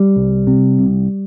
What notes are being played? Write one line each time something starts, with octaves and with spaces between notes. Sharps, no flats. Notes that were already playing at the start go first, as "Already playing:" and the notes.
Already playing: G3
C2
C3
C2